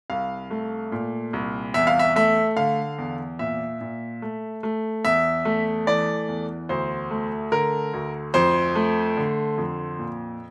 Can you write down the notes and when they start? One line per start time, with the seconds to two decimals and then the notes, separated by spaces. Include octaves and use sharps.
0.10 C2 F5
0.51 A3
0.92 A#2
1.33 C2
1.74 E2 E5
1.87 F5
1.99 E5
2.16 A3 E5
2.57 D3 F5
2.98 E2
3.39 A#2 E5
3.81 A#2
4.22 A3
4.63 A3
5.04 E2 E5
5.45 A3
5.87 E3 D5
6.28 E2
6.69 D2 C5
7.11 A3
7.52 D3 A#4
7.93 D2
8.34 F2 C5
8.75 A3
9.17 D3
9.58 F2
9.99 A#2